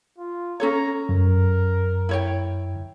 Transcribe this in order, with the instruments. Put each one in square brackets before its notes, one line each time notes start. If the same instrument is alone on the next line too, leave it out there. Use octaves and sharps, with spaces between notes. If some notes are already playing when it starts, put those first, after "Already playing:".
[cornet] F4
[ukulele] C#4 A4 C#5 [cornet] A#5
[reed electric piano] F#2 [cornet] A#4
[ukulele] E4 C#5 G5